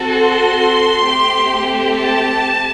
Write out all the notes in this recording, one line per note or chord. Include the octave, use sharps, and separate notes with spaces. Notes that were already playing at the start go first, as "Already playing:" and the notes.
Already playing: C4 F#4 A4
C6
A3 C4 G4
A5